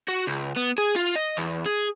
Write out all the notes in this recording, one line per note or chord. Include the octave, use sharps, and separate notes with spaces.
F#4
C#2
B3
G#4
F4
D#5
E2
G#4